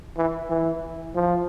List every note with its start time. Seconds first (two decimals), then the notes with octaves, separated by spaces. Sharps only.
0.17 E3
0.50 E3
1.15 F3